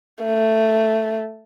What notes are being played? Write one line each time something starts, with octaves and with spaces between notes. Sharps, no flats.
A3